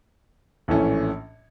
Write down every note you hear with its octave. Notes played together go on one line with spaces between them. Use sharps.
A#1 A2 E3 A3 C#4